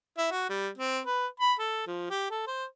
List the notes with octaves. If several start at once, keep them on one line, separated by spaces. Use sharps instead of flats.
E4
F#4
G3
C4
B4
B5
A4
F3
G4
A4
C5